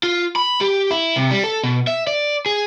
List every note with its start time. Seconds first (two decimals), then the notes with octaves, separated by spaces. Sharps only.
0.03 F4
0.36 B5
0.61 G4
0.91 E4
1.16 C3
1.31 G3
1.44 A4
1.64 B2
1.87 E5
2.07 D5
2.46 G#4